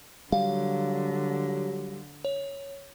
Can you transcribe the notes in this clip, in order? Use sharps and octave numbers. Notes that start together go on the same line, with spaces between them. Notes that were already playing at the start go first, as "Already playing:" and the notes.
D3 F#3 G3 F5
C#5